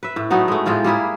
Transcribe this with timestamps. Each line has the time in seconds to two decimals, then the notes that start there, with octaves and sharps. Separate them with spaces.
0.03 B4 E5
0.16 A2
0.30 F#3 A3 B3 D#4
0.48 G#3 A3
0.66 A2 G#3 F4 G5
0.84 G3 A#3 E4 G#4